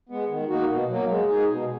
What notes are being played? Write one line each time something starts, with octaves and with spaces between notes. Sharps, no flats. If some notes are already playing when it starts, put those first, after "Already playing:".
G#3 B3
D#3
A#3 D#4 F#4
B2
F#3 A#3
G#3
D#4 G#4
B2